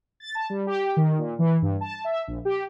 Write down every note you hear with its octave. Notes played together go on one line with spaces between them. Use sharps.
A6
A5
G3
G4
D#3
A#2
E3
G2
A5
E5
A#1
G4